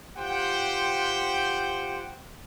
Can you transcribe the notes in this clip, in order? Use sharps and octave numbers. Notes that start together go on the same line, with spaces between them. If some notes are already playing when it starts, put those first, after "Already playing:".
F4 G4 C5 F#5 G5